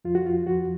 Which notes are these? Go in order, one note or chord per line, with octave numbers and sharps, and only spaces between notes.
F2 F3 F4
F#4
F4
F2 F3 F#4